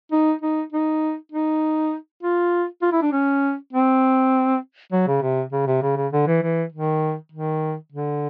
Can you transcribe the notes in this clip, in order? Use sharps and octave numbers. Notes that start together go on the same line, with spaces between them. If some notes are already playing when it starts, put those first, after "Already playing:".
D#4
D#4
D#4
D#4
F4
F4
E4
D4
C#4
C4
F#3
C#3
C3
C#3
C3
C#3
C#3
D3
E3
E3
D#3
D#3
D3